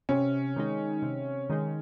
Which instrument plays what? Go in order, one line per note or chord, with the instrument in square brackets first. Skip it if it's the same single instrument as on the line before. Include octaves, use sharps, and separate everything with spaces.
[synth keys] C3 [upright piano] C#4
[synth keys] D#3 G#3 D#4
C3
D#3 G#3 D#4